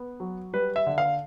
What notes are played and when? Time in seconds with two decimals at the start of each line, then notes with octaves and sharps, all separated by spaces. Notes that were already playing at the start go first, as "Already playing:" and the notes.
Already playing: B3
0.20 F#3
0.53 G3 B4
0.76 E5
0.87 D3
0.98 F5